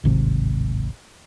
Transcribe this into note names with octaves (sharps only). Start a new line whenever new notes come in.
D1 G#1 C3